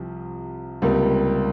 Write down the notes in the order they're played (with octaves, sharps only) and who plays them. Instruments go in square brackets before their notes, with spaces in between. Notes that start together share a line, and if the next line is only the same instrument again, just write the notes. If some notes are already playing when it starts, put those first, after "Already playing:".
Already playing: [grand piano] C2 C3 F3
C#2 C3 G3 A#3